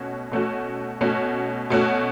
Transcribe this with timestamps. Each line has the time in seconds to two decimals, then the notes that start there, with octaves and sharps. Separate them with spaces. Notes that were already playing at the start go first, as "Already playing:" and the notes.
Already playing: B2 A3 C#4 F#4
0.31 B2 A3 C#4 F#4
1.01 B2 A3 C#4 F#4
1.70 B2 A3 C#4 F#4